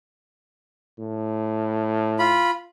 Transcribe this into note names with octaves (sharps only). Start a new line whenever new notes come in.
A2
F4 B5